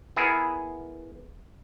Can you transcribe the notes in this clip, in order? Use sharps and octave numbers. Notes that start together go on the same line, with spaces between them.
B3 E4 G#4 A#4